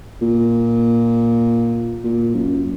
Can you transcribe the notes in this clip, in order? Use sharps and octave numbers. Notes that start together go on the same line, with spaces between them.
A#2
A#2
F#2